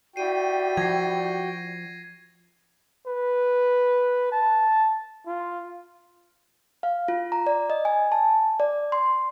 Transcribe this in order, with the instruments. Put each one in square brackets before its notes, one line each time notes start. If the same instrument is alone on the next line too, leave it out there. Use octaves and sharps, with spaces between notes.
[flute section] E4 G4 D5 [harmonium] F#4 G5 [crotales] C7 D#7
[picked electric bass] F3 [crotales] G#6 A#6 C7
[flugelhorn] B4
A5
F4
[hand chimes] F5
F4
A#5
D5
D#5
G#5
A5
D5
C6